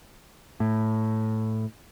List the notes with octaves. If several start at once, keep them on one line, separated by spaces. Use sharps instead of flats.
A2